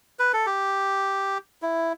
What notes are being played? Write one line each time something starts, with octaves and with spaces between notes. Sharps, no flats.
B4
A4
G4
E4